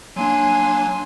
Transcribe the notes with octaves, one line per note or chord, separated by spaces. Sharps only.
F#3 A#3 D4 G#5 C6